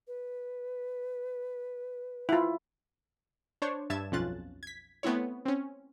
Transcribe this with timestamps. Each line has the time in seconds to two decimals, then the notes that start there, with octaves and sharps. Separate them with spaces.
0.07 B4
2.29 E4 F4
3.62 D4 C5 C#5 C#6
3.90 G2 E5 A5 G#6 E7
4.12 B1 F2 C#4 F4 F#6 A6
4.63 G#6 B6
5.03 A3 B3 C4 E4 C#5
5.46 C4 C#4